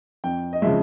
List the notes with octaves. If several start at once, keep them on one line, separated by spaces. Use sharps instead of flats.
F2 G5
D#5
C#3 F3 G#3 E5